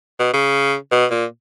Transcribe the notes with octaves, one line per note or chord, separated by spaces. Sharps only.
B2
C#3
B2
A#2